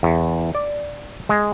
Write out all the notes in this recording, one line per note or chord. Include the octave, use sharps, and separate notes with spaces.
E2
D5
G#3